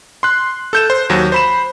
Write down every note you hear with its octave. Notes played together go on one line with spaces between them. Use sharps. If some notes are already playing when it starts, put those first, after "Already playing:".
C6 F#6
A4 G6 E7
C5
D#2 F#3
C5 B5 E7